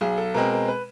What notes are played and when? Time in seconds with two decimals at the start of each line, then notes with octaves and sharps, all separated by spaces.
0.01 B1 G#4
0.17 A4
0.34 B2 G#3 C4 A#4
0.51 A#4
0.68 B4